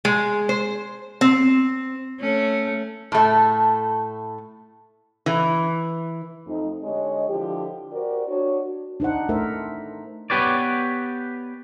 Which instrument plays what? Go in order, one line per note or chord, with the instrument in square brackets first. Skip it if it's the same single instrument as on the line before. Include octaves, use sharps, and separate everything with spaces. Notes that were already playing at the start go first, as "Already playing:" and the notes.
[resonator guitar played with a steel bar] G#3
C5
C4
[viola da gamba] A3 C#4
[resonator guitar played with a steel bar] A2 A3
E3
[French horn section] F2 A3 D#4
D3 G#3 G4 C#5 D#5
D3 F3 E4 G4
F#4 G4 A#4 C5 D5
D4 F#4 C#5
[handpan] D4 D#4 C5 F#5
A3 E4 A#4 C5 E5
[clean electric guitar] B3 G4 B4 C#5 D5